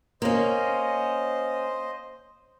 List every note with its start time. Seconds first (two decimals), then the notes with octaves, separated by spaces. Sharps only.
0.22 A#3 C#4 C5 D#5